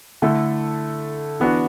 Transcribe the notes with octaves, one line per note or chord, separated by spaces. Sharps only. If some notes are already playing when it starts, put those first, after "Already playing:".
D3 A3 E4 A4
E3 B3 D4 F#4